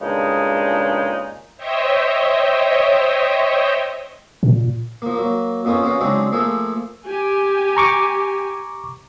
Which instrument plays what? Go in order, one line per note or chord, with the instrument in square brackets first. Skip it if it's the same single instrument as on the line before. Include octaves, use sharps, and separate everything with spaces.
[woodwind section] G2 A#2 C#3 G#3 D#4
[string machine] C5 C#5 D#5 E5 G5
[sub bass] A#2
[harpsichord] F3 A#3
F#3 A#3
F2 A#3 B3 C#4 F4
B3 C#4 F#4 F5
C#3 F#3 G#3 C4 D4 D#4
F3 A3 A#3 G#4 A4
[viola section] G4 G#5
[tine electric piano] A#5 C#6 D6